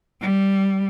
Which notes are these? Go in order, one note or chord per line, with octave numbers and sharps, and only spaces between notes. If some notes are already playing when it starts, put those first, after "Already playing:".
G3